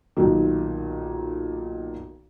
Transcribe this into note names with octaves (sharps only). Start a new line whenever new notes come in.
B1 A#2 D#3